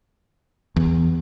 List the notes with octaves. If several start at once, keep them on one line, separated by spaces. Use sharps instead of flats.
E2